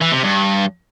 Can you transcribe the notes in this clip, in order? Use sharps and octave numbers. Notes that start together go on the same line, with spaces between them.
E3
C3
G2